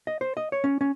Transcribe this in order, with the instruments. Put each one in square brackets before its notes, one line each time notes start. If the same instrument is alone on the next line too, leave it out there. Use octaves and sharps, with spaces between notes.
[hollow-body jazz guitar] D#5
C5
D#5
C#5
C#4
C#4